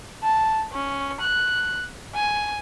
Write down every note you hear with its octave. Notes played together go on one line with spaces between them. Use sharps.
A5
C#4
F#6
G#5